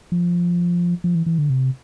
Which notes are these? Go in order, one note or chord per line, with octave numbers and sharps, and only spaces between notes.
F3
F3
E3
E3
D3
C3